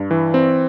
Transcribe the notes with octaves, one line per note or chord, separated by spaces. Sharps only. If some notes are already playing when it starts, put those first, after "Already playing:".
Already playing: G2
E3
C4